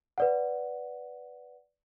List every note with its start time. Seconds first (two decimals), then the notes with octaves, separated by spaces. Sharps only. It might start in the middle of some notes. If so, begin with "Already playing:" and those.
0.18 B4 D5 F#5